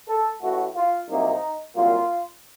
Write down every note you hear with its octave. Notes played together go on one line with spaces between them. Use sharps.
A4
A1 A2 A3 F#4
F4
C2 C3 F#3 A#3 D#4
C2 A#2 F#3 A#3 F4